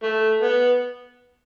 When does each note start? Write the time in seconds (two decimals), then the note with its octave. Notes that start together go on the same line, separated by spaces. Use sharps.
0.03 A3
0.42 B3